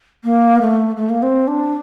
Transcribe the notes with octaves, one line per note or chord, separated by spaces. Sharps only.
A#3
A3
A3
A#3
C4
D4